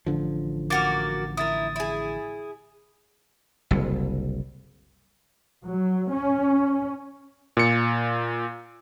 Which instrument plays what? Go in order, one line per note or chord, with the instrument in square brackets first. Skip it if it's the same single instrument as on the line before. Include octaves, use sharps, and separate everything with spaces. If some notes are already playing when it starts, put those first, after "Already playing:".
[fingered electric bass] A1 D3 F3
[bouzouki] A#3 F#4 A#4 [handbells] D6 A6
[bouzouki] E4 A#4 [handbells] D#6 A6
[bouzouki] E4 G#4
[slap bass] F#1 C2
[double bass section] F#3
C#4
[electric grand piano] A#2 C#7